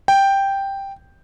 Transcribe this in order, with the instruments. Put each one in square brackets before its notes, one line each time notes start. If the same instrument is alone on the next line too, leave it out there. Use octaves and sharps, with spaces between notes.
[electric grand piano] G5